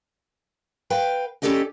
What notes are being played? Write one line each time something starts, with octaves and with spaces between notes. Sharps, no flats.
B4 F5 G5
C#4 G4 A4 D5 D#5 G#5